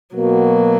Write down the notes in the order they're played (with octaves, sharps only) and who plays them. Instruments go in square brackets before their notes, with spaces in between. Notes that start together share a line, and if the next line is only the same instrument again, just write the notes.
[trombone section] B2 A#3 [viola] F#3